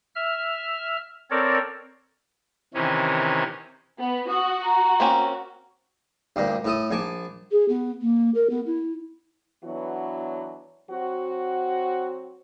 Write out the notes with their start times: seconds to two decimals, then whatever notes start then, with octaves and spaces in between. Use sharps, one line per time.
0.15 E5 F6
1.31 C4 A4 A#4 C#5 D5
2.74 C3 D#3 E3 C#4
3.99 B3
4.28 F#4 D#6
4.64 A#5
5.00 A#3 C4 C#4
6.36 D2 G2 A#2
6.64 A2 A4 D#6
6.91 A#1 G#5 A5 D6
7.51 G#4
7.69 B3
8.01 A#3
8.34 A#4
8.50 B3
8.66 E4
9.64 E3 F#3 B3 D4 F#4
10.90 F#3 C4 F#4